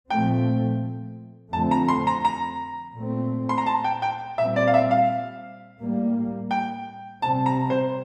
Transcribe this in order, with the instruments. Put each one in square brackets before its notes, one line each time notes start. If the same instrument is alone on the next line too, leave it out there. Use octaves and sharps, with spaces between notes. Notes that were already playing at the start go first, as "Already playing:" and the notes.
[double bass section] A#2 F3 A3 C4 [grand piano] G5
[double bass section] F2 D3 A3 C4 [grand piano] A5
[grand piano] A#5
C6
A#5
A#5
[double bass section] A#2 A3 C4
[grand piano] C6
A#5
A5
G5
G5
[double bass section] A#2 G3 C4 [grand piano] E5
[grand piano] D5
F5
E5
F5
[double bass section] A2 G3 A#3
[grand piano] G5
[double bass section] C3 G3 C4 [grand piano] A5
[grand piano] A#5
C5